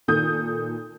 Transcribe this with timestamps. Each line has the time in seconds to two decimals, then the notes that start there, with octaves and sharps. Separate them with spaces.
0.08 A#2 D#3 A4 D#6 G6